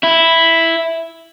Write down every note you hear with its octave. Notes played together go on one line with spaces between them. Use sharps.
E4